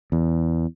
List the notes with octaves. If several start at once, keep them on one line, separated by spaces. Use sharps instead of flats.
E2